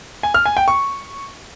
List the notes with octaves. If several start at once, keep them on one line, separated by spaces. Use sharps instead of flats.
G#5
F6
G#5
G5
C#6